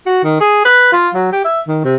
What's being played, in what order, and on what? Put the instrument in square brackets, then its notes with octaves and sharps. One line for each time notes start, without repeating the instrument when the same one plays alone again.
[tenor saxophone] F#4
D#3
G#4
B4
F4
F#3
G4
E5
D#3
C3